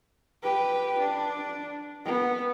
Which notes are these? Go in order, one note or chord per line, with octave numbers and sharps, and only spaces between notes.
G4 B4
D4
B3